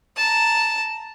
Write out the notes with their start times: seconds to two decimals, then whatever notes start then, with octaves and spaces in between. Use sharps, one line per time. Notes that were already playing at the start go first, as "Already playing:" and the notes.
0.17 A5 A#5